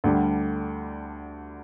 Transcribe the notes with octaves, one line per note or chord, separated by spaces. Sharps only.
D2 D3 G3 D4 G4